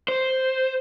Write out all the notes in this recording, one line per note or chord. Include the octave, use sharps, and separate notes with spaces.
C5